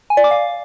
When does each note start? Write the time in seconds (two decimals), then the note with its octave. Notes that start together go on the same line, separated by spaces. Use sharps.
0.10 G#5
0.17 D5
0.24 D6
0.31 F5